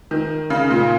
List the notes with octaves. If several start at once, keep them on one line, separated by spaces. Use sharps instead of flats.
D#3
C#3
A#2